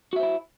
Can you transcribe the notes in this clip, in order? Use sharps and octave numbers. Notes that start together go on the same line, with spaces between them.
E4 F#4 C5 E5